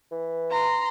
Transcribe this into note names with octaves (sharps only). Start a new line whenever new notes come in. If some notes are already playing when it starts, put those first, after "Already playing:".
E3
A#5 C6